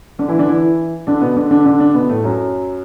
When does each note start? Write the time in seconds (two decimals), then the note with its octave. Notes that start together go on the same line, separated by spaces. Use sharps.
0.19 D3 D4
0.28 E3 E4
0.39 D3 D4
0.48 E3 E4
1.07 D3 D4
1.21 B2 B3
1.36 D3 D4
1.51 D3 D4
1.66 D3 D4
1.80 D3 D4
1.94 B2 B3
2.09 A2 A3
2.24 F#2 F#3